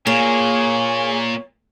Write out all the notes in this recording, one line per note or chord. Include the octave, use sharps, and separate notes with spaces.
A#2 A#3 G#4 C#5